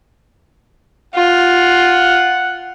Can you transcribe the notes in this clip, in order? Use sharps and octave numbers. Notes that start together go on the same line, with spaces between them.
F4 F#5